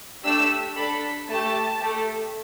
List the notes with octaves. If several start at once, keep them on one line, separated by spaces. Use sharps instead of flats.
A3 D4 G4 E6
D4 A4 B5
A3 G4 A5
A3 G4